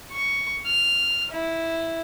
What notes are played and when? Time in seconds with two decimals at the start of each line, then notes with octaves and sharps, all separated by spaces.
0.12 C#6
0.66 F6
1.31 E4